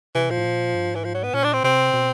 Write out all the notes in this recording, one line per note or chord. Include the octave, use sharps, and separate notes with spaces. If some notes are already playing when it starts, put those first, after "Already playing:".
C3 E3
A#2 F3
A2
A#2
G2
G#2
E3
F3
F#3
B3
A#2 C#4
D4
C4
C3 C4
B2